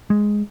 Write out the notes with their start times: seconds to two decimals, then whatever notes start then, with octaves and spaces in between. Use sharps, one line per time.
0.10 G#3